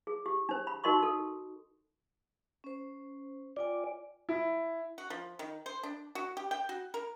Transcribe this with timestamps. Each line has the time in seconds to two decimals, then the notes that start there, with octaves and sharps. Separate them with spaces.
0.07 G#4
0.26 G4
0.49 D4 C5
0.67 B5
0.84 D#4 F#4 A#4 D#5 C6 C#6
1.03 A4
2.64 C#4 C5
3.57 F4 D5 G5 G#5
4.29 E4
4.98 F#4
5.10 F3
5.39 D#3
5.66 C5
5.83 D4
6.15 F#4
6.37 G4
6.51 G5
6.69 F#4
6.94 A#4